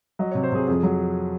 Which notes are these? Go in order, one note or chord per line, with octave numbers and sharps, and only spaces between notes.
F#3 D#5
C#5
C3
C5
C3 G#4
F2 G#4
F#3